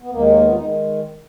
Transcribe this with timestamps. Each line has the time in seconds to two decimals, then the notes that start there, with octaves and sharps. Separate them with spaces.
0.02 B3
0.10 D#2 D#3 G#3 A#3
0.26 A#3
0.41 B3
0.49 F4
0.55 D#3 G#3 D#4